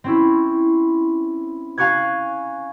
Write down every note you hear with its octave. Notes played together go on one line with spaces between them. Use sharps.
C4 C#4 E4
F5 G#5 C#6 F#6 G#6